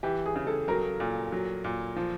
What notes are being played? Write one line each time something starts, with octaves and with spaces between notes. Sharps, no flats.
E3 G4
G#4
C#3
A4
F#3 A#4
A#2
F#3
A#2
F3